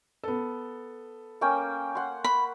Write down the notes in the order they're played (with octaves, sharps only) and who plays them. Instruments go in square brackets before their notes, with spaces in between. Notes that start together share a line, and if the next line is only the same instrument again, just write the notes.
[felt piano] B3 A4
[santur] A#3 C#4 G5
F#5 C6
[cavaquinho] B5